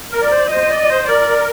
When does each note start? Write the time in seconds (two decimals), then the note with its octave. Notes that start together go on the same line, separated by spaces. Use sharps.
0.12 A#4
0.21 D5
0.31 C5
0.51 C5 D#5
0.70 D5
0.89 C5
1.08 A#4 D5